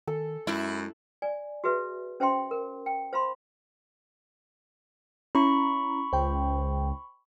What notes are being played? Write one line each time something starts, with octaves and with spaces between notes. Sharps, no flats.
D#3 A4
F#2 G#3 E4
D5 G#5
F#4 G#4 B4 E5
C#4 C5 E5 G5 C6
A#4
G5
C5 F5 B5 C6
C#4 E4 A#5 B5 C#6
C#2 C5 G5